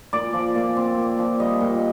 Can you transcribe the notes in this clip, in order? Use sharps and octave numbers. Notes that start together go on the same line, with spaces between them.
A#2 D5
F3
A#2
C4
A#2
F3
G3 D#5
A#2